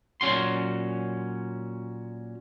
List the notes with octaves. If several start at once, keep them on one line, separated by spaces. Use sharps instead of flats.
A#2 F#3 C#4 F#4 C6